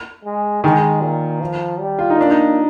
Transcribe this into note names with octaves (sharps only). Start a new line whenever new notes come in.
G#3
D#3 G#3
A#2
F3
G3
F4
D#4
A#3 D4
D#4